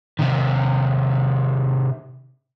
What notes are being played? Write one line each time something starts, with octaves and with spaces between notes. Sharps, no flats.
C3 D#3